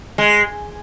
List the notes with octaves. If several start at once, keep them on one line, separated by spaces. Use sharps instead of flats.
G#3